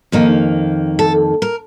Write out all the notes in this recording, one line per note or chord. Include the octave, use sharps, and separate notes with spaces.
F2 D#3 A#3 D#4
A4
A#4